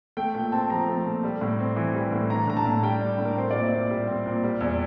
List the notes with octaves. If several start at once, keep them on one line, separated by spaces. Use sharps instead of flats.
A3 G5
A#2 G5
C4 A5
F3 A#5
A3
A#2
G3
A2
C4
E3
G3
A2
D4 A#5
A2 A#5
A5
A2
G3 G5
D4
A2
A#4
C4 C5
A#2 D5
E5
A#2
G3
C4
A#2
G3
E2